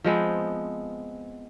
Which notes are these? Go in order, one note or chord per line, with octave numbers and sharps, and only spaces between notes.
F3 G#3 B3 C4